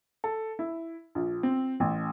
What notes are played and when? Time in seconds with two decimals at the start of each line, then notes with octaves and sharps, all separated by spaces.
0.24 A4
0.59 E4
1.15 A#1
1.43 C4
1.80 A1